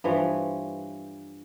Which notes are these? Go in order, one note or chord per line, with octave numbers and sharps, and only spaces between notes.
G2 E3 F3 C#5